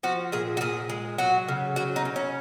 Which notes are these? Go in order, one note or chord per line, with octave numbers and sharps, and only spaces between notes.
F3 F#4
A#2 G#4
F#4
A#2 G#4
G#3
F#3 F#4
C#3
F#3 F#4
D#4
C#3
C#4